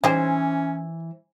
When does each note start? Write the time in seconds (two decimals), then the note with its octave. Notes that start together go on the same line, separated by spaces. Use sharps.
0.04 E3 C#4 D#4 G4 C5 G#5